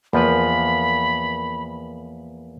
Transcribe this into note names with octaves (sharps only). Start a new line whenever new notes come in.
E2 F3 A#3 B4 B5